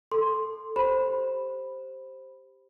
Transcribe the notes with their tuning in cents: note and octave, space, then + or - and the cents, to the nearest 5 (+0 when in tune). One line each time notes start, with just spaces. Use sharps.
A4 +0 C6 +5
G4 +0 C5 +5 B5 +0